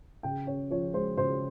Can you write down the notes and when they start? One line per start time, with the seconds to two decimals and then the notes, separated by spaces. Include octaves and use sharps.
0.23 C#3 G5
0.47 C#4 C#5
0.70 F3 C#5
0.94 G#3 C5
1.17 C#3 C5